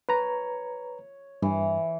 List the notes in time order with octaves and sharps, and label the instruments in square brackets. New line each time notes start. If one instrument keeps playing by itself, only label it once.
[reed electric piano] B4 A#5 [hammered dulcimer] C#5
[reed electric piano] G2 [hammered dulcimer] E3